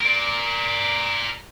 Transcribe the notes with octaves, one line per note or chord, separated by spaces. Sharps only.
A#4 D5